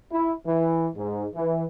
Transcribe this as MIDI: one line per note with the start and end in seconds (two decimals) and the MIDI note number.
0.11 0.32 64
0.45 0.87 52
0.95 1.26 44
1.35 1.64 52